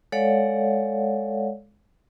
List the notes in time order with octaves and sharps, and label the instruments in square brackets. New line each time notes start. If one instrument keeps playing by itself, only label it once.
[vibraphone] G#3 A4 C#5 D5 F5 F#5